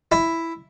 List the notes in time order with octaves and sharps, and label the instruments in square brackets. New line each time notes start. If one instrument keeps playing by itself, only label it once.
[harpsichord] E4